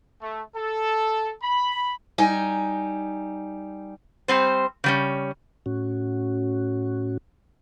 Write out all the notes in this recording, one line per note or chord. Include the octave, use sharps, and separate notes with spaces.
A3
A4
B5
G3 D#4 G#5
G3 C4 C5
C#3 G3 C#4
A2 C#4 F#4